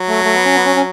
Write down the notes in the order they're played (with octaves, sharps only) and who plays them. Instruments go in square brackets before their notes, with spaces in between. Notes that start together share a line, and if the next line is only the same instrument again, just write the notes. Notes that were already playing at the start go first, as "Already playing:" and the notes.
Already playing: [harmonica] F#3
[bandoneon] A3
A3
B3
C#4
B3
C#4
C#4